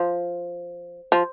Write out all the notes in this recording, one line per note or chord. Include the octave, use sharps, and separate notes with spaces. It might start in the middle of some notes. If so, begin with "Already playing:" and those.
Already playing: F3
F3